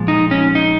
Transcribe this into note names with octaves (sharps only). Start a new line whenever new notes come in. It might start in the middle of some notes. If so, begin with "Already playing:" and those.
Already playing: A#2 F3 G#3
D#4
C#4
D#4